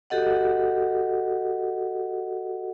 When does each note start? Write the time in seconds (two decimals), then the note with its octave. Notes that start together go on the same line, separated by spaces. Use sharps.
0.10 F#4 G4 A4 D#5 F#5